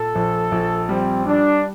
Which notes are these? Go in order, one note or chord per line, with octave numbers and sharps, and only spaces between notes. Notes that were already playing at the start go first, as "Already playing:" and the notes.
Already playing: A#2 A4
A#1
A#1
G3 C4
G3 D4